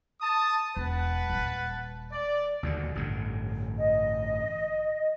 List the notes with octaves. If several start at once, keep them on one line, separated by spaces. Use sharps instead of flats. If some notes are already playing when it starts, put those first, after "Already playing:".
A5 D#6
E1 B4 F#5 A5
D#1 G3
D5
D#2 B2 D3
A1 G2 D3
D#5